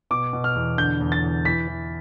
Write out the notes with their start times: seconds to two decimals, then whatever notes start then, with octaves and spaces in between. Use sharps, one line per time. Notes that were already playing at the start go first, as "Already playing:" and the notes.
0.11 B2 D6
0.33 B2
0.44 F6
0.55 E2
0.78 D3 G6
1.00 E2
1.12 A6
1.22 E2
1.45 E3 B6
1.67 E3